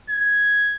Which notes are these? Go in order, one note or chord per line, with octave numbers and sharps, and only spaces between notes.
G#6